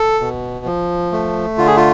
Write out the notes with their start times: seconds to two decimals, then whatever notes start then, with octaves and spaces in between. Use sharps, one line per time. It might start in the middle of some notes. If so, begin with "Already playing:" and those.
Already playing: A4
0.20 B2
0.65 F3
1.12 A3
1.57 D3 F4
1.67 G#4
1.77 F4